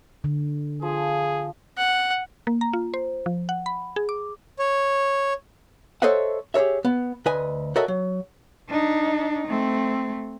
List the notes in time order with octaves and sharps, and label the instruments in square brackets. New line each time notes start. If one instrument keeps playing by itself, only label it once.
[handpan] D3
[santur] F3 [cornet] G#4
[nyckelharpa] F#5
[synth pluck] A#3
A#5
F4
C5
F3
F#5
B5
G#4
D6
[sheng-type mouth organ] C#5
[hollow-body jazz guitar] A4 C5 C#5 D#5 E5 F#5
G4 G#4 A#4 C#5 E5
B3
D2 B4 D#5 G#5
F#4 A4 A#4 C#5 D#5 E5
F#3
[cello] D4 D#4
A3 C4